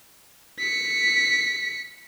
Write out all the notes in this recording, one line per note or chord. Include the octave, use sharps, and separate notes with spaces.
B6 C#7